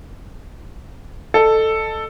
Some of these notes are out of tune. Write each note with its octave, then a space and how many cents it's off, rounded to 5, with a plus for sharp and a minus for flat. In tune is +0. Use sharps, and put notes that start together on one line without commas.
A4 +5 D#5 -25